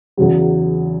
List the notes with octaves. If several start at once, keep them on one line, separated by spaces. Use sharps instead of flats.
E2 C#3 F#3